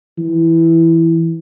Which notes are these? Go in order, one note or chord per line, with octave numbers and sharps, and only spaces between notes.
E3